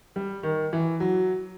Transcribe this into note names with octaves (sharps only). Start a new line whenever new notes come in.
G3
D#3
E3
F#3